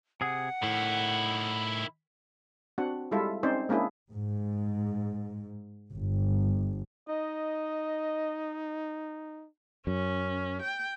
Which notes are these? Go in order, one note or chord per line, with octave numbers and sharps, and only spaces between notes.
C3 G#4 F#5
A2 D#3 E4
C4 D4 F#4 F#5
G3 G#3 E4 F4 A4 E5
C4 C#4 D#4 C5 D5
G#3 A#3 C#4 D4 E4 G#4
G#2
G1
D#4 D#5
F#2 C#4
G5